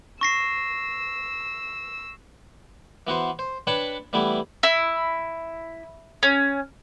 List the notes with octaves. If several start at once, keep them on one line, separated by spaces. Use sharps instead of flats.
C#6 E6 A#6 C7
E3 B3 F#4 C5
C5
D4 B4 C#5 G5 A5 B5
E3 G3 A3 B3 E4
E4
C#4